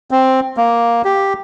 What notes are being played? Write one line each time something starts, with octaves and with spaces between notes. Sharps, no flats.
C4
A#3
G4